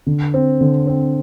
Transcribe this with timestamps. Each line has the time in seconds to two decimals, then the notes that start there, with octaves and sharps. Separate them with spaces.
0.07 D3
0.34 C4
0.61 D3
0.87 C4